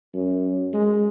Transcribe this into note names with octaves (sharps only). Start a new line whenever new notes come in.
F#2
G#3